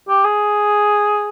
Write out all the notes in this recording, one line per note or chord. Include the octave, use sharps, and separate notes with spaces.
G4
G#4